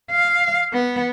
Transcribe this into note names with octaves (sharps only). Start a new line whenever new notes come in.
F5
B3